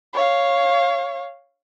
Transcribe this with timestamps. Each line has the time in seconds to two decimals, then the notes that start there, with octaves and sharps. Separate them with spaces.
0.14 C#5 F5